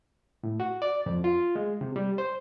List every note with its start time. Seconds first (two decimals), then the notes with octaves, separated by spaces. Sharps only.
0.43 A2
0.60 F#4
0.82 D5
1.06 F2
1.24 F4
1.55 G#3
1.81 C3
1.96 G3
2.18 C5